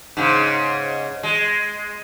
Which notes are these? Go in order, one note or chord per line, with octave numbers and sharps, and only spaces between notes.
G#2 C#3
G#3